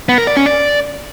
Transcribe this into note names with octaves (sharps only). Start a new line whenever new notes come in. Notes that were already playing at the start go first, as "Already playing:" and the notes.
B3
A#4
D5
C#4
D5